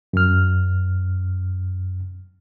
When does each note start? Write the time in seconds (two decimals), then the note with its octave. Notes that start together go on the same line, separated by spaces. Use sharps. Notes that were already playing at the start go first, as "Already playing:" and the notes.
0.13 F#2 F6